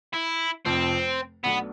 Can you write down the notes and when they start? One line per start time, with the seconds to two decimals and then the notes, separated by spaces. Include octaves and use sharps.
0.14 E4
0.65 F1 F2 C3 F3 C4
1.43 B1 B2 A3 B3 D4